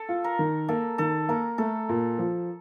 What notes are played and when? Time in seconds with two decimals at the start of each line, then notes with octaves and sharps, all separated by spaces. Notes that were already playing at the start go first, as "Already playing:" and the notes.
Already playing: A4
0.09 F4
0.24 A#4
0.39 D#3
0.68 A#3 A4
0.98 D#3 A4
1.29 A#3 A#4
1.58 A3 A4
1.89 A#2
2.19 F3